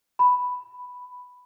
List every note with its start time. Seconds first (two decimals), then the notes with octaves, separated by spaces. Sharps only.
0.19 B5